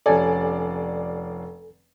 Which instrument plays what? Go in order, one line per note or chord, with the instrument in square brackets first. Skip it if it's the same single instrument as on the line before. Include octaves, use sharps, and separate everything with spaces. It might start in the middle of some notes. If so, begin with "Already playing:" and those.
[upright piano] F1 C#4 D5 [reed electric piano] A4 G#5